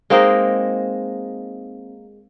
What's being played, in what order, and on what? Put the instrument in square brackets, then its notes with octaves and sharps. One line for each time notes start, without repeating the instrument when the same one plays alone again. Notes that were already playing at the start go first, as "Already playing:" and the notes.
[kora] G#3 A#3 C4 D#4